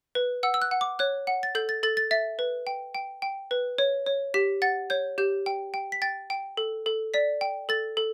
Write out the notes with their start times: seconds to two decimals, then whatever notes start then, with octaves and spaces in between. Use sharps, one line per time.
0.15 B4
0.43 F#5 E6
0.54 E6
0.62 F#6
0.71 F#5
0.81 D6
0.99 C#5 F#6
1.27 F#5
1.43 A6
1.55 A4 G6
1.69 A6
1.83 A4 A6
1.97 A6
2.11 E5 A6
2.39 B4
2.67 G5
2.95 G5
3.22 G5
3.51 B4
3.78 C#5
4.06 C#5
4.34 G4 B6
4.62 F#5 A6
4.90 C#5 G6
5.18 G4 G6
5.46 G5
5.74 G5
5.92 B6
6.02 G5 A6
6.30 G5
6.57 A4
6.86 A4
7.14 D5 B6
7.41 G5
7.69 A4 A6
7.97 A4